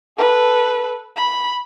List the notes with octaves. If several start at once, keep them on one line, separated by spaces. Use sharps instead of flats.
A4 B4
B5